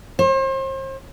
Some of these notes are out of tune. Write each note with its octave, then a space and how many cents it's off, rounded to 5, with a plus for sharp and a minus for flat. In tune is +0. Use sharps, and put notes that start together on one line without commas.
C5 +40